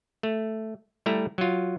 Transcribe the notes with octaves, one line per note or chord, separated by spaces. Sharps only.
A3
G3 A3 E4 A#5
F#3 F4